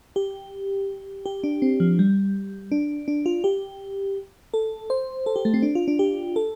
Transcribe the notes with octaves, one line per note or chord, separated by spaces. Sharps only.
G4
G4
D4
C4
F3
G3
D4
D4
F4
G4
A4
C5
A4
G4
A3
C4
D4
F4
D4
G4
A4